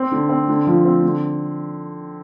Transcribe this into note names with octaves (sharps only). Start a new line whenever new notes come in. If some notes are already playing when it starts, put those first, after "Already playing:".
Already playing: C4
D3
C4
D3
F3
C4
D3